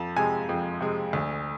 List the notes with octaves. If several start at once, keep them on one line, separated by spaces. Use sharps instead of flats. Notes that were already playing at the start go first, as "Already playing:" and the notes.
Already playing: F2 A5
C3 G#3 G#5
F2
C3 G#3
D2